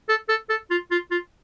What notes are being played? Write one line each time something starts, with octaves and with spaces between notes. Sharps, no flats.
A4
A4
A4
F4
F4
F4